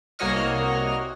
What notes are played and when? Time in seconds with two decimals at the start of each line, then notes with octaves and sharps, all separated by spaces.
0.19 C2 A#3 F#4 C#5 D#5 F6